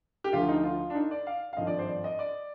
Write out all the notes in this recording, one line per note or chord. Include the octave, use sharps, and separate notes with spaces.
G4
D2 D3 F3 F4
D#4
F4
D4
D#4
D5
F5
F5
G#1 G2 F3 D#5
D5
C5
D5
D#5
D5